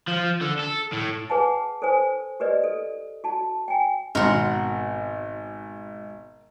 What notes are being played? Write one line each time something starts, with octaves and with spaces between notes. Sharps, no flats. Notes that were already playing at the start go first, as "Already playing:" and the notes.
F3
D3
A4
A2
G#4 B4 F#5 G#5 A5
A4 B4 C5 G#5
G4 A#4 B4 D5 D#5
A4
F#4 A5
G5 G#5
G#1 B2 A#4 F#5 C6